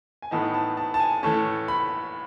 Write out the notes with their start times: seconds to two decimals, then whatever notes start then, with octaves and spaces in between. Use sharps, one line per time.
0.22 G#5
0.31 A2 E3 B3 D#4 A5
0.54 A5
0.77 A5
0.94 A5
1.00 G#5
1.23 A2 E3 A3 C#4 A5
1.68 B5